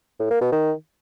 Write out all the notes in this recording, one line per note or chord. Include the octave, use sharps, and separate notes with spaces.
A2
A#3
B2
D#3